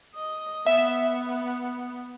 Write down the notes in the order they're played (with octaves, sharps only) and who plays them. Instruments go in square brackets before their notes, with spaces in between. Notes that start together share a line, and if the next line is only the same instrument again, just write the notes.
[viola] D#5
[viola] B3 [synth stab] E5